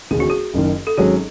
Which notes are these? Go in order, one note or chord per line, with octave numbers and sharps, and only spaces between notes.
E1 D#2 C#3 G#3 G#4
F#4
G#4
F#1 F#2 D#3
A4
G#1 G#2 F#3 C#4 G#4